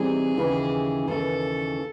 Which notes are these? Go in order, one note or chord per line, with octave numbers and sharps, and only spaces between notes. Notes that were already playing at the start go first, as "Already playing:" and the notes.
Already playing: C3 E3 G3 C4 D#4 G#4
D#2 C#3 E3
D#2 C#3 E3 A4